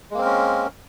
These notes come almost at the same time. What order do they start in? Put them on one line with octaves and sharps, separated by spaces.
G#3 A#3 C4 A#4 C#4